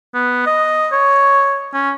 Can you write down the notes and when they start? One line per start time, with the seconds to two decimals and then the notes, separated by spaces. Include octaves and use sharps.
0.14 B3
0.46 D#5
0.92 C#5
1.74 C#4